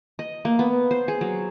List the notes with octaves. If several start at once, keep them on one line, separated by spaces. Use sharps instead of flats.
D#5
A#3
B3
C5
G#4
F#3